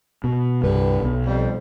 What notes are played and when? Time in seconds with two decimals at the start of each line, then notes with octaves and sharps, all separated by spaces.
0.24 B2
0.63 C2 G2 D3 G4 B4
1.02 B1
1.26 F2 G3